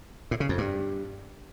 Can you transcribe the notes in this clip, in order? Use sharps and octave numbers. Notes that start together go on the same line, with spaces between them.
A2
C#3
F2
G2